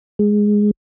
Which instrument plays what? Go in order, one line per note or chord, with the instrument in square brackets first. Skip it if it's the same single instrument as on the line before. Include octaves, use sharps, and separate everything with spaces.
[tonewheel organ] G#3